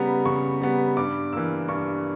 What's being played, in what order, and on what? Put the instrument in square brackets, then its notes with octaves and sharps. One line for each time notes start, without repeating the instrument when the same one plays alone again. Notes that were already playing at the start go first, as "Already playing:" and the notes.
Already playing: [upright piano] C#3 G3 B3 A#5
C#3 C#6
G3 B3
G2 D6
E3 A#3 E6
G2 C#6